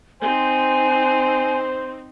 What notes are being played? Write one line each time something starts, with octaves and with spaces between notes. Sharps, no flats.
C4 D#4 C5 G#5